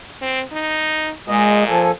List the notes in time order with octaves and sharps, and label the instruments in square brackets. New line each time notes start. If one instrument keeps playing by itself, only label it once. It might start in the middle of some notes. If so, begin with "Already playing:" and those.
[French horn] C4
D#4
[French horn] A#2 [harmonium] G#3 D#5
[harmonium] F3 A4 G#5